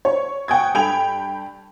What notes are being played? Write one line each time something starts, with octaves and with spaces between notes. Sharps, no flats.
C#5
F#5 G5 C#6 D#6 G#6
G2 A4 G5 B5 G#6 F7